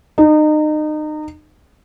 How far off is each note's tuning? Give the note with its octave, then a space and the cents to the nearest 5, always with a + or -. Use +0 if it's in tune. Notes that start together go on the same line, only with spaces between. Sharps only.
D#4 -30